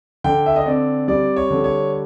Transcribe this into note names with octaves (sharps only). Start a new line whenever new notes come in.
D3 G5
E5
D#5
C4 D5
G3 D5
C#5
D3
C#5